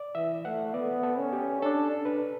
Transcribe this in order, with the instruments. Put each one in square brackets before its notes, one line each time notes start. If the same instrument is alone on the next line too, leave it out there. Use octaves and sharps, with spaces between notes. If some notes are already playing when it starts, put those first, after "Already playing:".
Already playing: [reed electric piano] D5
[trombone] E3 [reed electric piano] E5
[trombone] A3 [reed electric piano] F#5
[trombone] B3 [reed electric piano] D5
[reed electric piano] A4
[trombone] C#4
[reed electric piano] G4
[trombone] D4 [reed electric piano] A4
[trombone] D4
[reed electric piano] B4